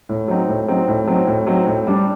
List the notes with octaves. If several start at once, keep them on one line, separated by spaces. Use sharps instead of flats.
A2
F#3 C4 D#4
A2
F#3 C4 D#4
A2
F#3 C4 D#4
A2
F#3 C4 D#4
A2
G3 D4